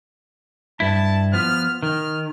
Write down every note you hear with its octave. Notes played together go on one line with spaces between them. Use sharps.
G2 E4 A5
F3 B3 F6
D#3 F6